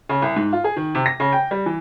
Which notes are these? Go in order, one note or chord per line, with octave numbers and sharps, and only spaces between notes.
C#3
C2
G#2
F4
G#4
D#3
C3
A#6
C#3
G5
G3
E3